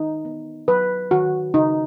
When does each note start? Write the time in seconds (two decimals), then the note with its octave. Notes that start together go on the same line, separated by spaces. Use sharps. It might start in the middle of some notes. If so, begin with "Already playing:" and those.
Already playing: D#3 D#4
0.25 B3
0.68 F#3 B4
1.11 D#3 F#4
1.54 C#3 D#4